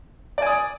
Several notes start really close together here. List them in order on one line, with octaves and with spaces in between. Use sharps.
D5 G#5 D#6